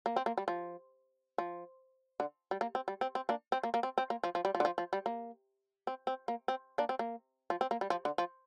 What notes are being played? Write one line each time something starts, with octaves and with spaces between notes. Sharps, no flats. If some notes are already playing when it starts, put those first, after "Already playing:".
A#3
C4
A#3
G3
F3
F3
D3
G3
A#3
C4
G3
C4
C4
A#3 D4
C4
A#3
A#3
C4
C4
A#3
F3
F3
G3
F3
D3
F3
F3
G3
A#3
C4
C4
A#3
C4
A#3 D4
C4
A#3
F3
C4
A#3
G3
F3
D3
F3